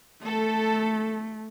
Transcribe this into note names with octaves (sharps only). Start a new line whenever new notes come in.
A3 A4